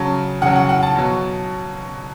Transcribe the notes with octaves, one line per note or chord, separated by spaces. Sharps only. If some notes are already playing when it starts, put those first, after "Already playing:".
Already playing: C#3 F#3 A5
C#3 F#3 F#5
F#5
F#5
A5
B2 F#3